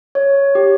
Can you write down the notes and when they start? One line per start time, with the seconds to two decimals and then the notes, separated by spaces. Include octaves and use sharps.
0.15 C#5
0.55 G4